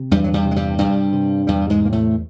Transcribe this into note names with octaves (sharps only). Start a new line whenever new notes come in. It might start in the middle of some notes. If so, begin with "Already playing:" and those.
Already playing: C3
E2 G2 G3
F#3
G2 G3
C3
G#3
G2 G3
G2 C3 G3
C3
E2 G2 G3
G#2 G#3
C3 A#3
A2 A3